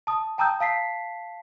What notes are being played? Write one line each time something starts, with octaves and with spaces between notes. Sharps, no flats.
A5 D#6
G5 A5 A#5 D#6 E6 G6
F5 A5 B6 C7